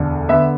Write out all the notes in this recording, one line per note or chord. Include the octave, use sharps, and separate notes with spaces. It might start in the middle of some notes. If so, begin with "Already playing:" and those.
Already playing: E1 D2 D3 D4
D3 B3 E5